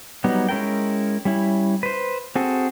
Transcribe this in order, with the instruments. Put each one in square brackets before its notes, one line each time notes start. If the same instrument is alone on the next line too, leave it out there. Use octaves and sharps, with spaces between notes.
[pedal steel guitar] F#3 G3 B3 D#4
G#3 C#4 E4 A#4 G5
G3 C#4 E4
B4 C5
C4 F#4 G#4 A4